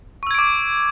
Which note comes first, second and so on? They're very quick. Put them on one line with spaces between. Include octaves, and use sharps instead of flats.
C#6 E6 G#6 D7 D6